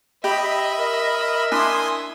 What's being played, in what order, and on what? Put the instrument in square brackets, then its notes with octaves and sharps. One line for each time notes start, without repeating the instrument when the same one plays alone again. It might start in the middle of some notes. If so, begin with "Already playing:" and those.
[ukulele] G4 [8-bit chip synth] D#5 B5 [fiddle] E5
[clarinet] A#4
[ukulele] D4 E4 [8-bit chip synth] G#5 C6 D#6